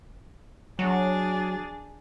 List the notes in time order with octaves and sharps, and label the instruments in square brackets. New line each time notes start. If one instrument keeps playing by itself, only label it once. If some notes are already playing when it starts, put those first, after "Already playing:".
[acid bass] F#3 [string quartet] D4 G#4 A6